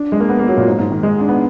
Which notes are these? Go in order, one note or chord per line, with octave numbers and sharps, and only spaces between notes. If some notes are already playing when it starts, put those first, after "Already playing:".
Already playing: D4
G#3
A#3
B3
A#3
F#3
A#2
G#2
G#2
D#3
G#3
D4
B3